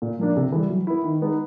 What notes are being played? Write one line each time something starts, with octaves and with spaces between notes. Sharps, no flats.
A#2
F3 A#3 D4
C3
E3 G3
F#3
B3 E4
D#3
G#3 B3 D#4